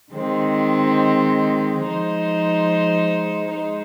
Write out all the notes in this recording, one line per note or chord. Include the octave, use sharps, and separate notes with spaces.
D#3 G#3 C4
F3 G#3 D#4 C5
G#3 D#4 C5